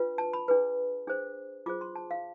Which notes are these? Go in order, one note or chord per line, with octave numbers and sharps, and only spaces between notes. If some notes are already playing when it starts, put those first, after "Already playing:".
Already playing: D4 F4 B4
A5
B5
D4 G#4 B4
D4 G#4 C5
F4 G#4 C5 D6
C6
A5
F5